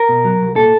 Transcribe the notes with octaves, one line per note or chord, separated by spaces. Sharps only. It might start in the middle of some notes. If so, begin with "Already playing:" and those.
Already playing: A#4
B2
F#3
C2
A#2 A4